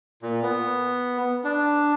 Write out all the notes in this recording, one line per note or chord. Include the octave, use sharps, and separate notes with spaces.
A#2
B3
D4